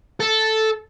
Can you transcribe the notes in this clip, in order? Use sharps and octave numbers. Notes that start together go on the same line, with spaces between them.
A4